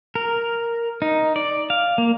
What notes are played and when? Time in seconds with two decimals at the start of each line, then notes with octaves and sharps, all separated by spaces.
0.15 A#4
1.02 D#4
1.36 D5
1.70 F5
1.98 A#3